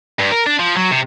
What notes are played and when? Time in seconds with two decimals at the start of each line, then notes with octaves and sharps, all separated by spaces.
0.19 G2
0.31 A#4
0.46 D4
0.59 F3
0.77 F#3
0.91 C3